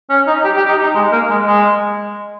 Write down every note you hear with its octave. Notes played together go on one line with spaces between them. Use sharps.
C#4
D#4
G4
G4
D#4
D#4
G#3
A#3
G#3
G#3